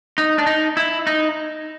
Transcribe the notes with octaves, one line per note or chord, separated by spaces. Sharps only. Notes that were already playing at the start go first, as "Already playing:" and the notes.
D#4
D4
D#4
E4
D#4